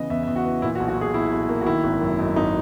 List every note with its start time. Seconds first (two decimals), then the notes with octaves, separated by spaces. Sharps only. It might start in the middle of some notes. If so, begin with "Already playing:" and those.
Already playing: C#3 E3 B3 D#5
0.10 E2 E5
0.23 E5
0.27 E2
0.36 F#4
0.45 E3
0.62 A#2 E4
0.75 F#4
0.80 B1
0.88 F#4
0.97 B1 G#4
1.14 B1 E4
1.32 B1
1.49 A#3
1.61 F#4
1.66 D#3 E4
1.84 G#1
2.02 F#2
2.19 F#2 D#4
2.36 G#1 D#4